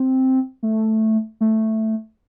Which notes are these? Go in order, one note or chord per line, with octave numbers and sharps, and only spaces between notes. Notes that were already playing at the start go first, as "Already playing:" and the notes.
Already playing: C4
A3
A3